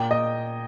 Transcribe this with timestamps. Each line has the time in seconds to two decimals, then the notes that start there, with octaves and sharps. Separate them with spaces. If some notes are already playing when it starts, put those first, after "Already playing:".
Already playing: A#2 G5
0.11 D#5